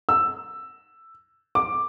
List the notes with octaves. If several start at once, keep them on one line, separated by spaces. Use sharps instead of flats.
E6
D6